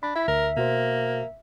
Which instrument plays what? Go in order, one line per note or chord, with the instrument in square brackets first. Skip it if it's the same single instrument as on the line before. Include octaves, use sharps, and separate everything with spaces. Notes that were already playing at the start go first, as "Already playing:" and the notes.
[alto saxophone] D4 [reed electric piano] B5
[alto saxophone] E4 [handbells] E5
[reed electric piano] D2 [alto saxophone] A#4
[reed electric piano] B2 F#4 C5 [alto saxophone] A#3